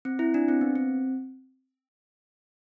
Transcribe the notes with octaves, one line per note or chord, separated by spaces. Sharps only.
C4
E4
D4
C4
B3
C4